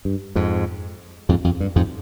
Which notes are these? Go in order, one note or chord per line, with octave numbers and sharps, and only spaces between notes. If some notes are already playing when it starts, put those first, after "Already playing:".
G2
F2 G#2
F2 G#2
F2
G2
F2 G#2